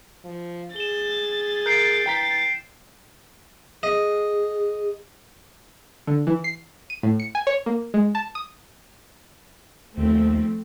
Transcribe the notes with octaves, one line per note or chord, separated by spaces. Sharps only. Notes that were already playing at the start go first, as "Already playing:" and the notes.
F3
G#4 A6 E7 G7
A#4 G6 C7 D7
E3 G5 A#5 B6
G#4 D#5
D3
E3
C7
D#7
A2
C#7
G#5
C#5
A#3
G#3
A5
D#6
D#2 F3 A3 C4